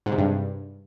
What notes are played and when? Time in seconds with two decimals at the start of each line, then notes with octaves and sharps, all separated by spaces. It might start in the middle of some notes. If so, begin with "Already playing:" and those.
0.06 G#2
0.12 C3
0.18 G2